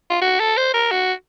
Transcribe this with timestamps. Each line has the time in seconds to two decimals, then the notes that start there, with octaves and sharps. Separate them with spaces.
0.10 F4
0.21 F#4
0.39 A4
0.57 C5
0.74 A#4
0.91 F#4